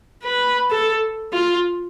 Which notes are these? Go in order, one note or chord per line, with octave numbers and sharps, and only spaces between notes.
B4
A4
F4